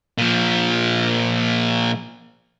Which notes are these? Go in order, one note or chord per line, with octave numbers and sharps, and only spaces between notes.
A#2 F3